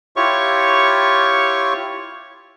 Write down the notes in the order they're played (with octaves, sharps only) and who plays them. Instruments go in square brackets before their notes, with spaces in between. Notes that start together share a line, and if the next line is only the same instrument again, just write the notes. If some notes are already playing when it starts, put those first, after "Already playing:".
[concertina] E4 F4 G4 C#5 C#6